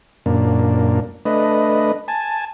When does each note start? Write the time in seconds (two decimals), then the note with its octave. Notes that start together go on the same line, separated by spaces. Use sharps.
0.26 F#2 A#2 A#3 D4
1.25 A3 D4 B4 D#5
2.08 G#5 A5